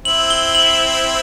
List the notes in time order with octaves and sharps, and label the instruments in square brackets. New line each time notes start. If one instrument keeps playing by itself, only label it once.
[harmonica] C4 E4 [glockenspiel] F#7
[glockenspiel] G7
F#7